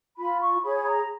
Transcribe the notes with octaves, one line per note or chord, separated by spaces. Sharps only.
F4 B5
C#6
G#4 C#5 B5
A#5